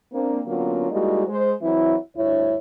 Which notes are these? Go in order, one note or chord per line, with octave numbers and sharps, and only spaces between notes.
A#3 C4 D4
D3 F#3 A#3 B3 C#4 F4
G3 G#3 A#3 D#4 E4 F#4
G#3 C5
E3 F#3 C4 E4
D2 G2 E4 C#5